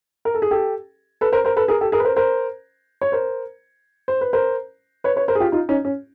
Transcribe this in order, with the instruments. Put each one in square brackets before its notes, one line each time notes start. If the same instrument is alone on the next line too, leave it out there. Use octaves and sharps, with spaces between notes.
[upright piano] A#4
A4
G#4
G4 A4
A4 B4
A#4 C5
A#4 C5
A4 B4
G#4 A#4
G4 A4
G#4 A#4
B4
A#4 C5
A#4 C5
C#5
A#4 C5
C5
B4
A#4 C5
B4 C#5
B4 C#5
A#4 C5
G#4
F4 G4
D#4 F4
C#4 D#4
C#4